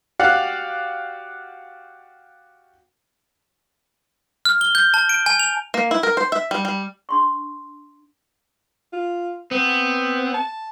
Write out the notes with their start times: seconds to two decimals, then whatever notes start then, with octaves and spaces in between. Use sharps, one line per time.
0.19 F#4 G4 D5 F5 F#5
4.45 F6
4.61 G7
4.75 G6
4.94 A5
5.09 D7
5.26 G#5
5.39 F7
5.74 A#3
5.91 E4
6.03 A#4
6.17 C5
6.32 E5
6.51 G3
6.65 G3
7.09 D4 C6 C#6
8.93 F4
9.51 B3 C4
10.34 A5